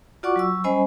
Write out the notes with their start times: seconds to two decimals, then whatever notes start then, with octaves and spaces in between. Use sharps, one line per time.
0.23 F4 F#4 D5 F#5 C#6 D6
0.36 F#3 C#6 E6
0.64 G3 C#4 C5 D#5 G#5 B5